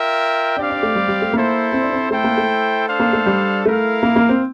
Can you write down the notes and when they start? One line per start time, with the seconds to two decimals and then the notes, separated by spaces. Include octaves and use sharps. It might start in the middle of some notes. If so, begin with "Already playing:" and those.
Already playing: F4 A#4 E5 G5
0.57 C4 D4 G4 D5 F5
0.70 D4
0.83 A3
0.96 G3
1.08 G3
1.22 A3
1.33 A#3 E4 A4 C5
1.72 C4
1.83 D4
1.92 C4
2.11 A3 E4 A4 C5 G5
2.24 A#3
2.37 A3
2.87 D4 A4 C5 F5
3.00 A#3
3.13 A3
3.26 G3
3.65 A3 E4 A#4 F5
4.03 A#3
4.16 A#3
4.29 C4